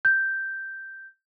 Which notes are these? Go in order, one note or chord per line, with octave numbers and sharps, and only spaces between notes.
G6